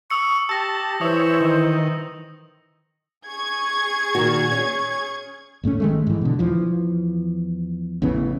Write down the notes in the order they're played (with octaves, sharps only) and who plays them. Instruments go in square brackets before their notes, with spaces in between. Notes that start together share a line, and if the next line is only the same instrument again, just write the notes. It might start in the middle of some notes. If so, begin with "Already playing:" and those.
[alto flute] C#6 [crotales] D#6 E6 C#7
[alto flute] G4 [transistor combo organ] A5 [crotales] E6 A#6
[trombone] E3 [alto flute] C5 [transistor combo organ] C#5 E5 [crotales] D#6
[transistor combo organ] D#3
[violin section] G#4 C#6 G#6
[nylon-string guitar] A#2 D#3 F#4
C#4
[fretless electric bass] G1 A2 A3 C#4
D#3 G#3 A3
G#2 E3
B2 D3
E2 E3 F3
A1 C#3 E3 B3